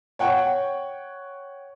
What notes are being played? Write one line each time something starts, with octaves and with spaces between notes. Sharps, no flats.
C#5 F#5 G5 C#6